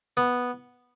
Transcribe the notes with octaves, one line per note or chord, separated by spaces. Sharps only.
B3